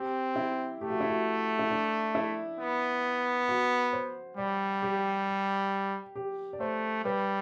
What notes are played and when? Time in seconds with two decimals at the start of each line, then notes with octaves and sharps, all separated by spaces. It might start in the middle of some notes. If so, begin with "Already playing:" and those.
Already playing: C4 G4
0.36 E4
0.81 A3 G4
0.90 F#4
1.00 E4
1.09 F#4
1.59 E4
1.70 D4
2.15 E4
2.59 B3
3.49 F#4
3.93 C5
4.37 G3 D5
4.83 G4
6.16 G4
6.53 D5
6.60 A3 C5
7.05 G3 B4